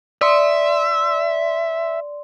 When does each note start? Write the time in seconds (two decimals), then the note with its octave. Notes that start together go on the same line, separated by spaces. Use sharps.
0.21 D5 E5 C6